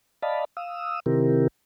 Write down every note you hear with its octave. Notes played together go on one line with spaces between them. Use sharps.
D5 D#5 F5 A5 B5
F5 D#6 E6
C3 D#3 C4 E4 G4 A#4